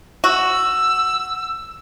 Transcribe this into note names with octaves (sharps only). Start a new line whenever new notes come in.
F#4 E6